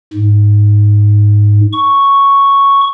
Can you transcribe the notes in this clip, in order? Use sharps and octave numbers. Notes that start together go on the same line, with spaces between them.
G#2
C#6